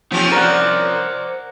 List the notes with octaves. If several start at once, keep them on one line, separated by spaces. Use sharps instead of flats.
F3 C4 C#4 D#4 G4
A#4 C5 D5 F#5